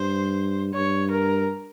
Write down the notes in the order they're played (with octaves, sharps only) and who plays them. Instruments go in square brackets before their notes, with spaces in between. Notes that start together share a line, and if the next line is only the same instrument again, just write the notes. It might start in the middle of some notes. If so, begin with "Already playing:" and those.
Already playing: [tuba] G2 [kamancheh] C5
[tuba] G2 [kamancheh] C#5
[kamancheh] A#4